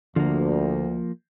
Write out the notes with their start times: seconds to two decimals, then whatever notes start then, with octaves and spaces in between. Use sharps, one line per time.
0.16 D2 D3 F3 A#3